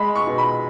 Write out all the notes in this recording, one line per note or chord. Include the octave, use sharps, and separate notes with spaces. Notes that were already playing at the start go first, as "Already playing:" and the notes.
Already playing: G#3 B5
C#6
B2
B5